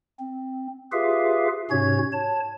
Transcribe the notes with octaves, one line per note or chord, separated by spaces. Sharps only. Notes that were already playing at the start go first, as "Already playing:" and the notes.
C4
F4 G4 G#4 B4 E5 F5
G#2 C3 C#4 F#4 C#5 G#6
C#5 A5